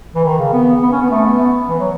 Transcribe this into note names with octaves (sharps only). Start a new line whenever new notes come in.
E3
D#3
C#3
B3
B3
C#4
B3
A3
B3
E3
F#3